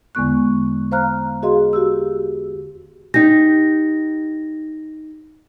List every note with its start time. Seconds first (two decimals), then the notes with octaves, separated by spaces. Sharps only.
0.15 E2 D3 G#3 B3 C#6 F#6
0.92 C5 F5 A#5 F6 F#6
1.43 F#4 G#4 D#5 F5 C6
1.73 F#4 G4 E6
3.14 D#4 G4 A#6